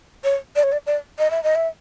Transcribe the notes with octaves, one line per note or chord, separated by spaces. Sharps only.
C#5
D5
C#5
D5
D5
D#5
E5
D#5
E5